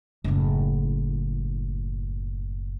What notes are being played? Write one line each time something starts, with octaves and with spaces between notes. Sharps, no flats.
F#1 A2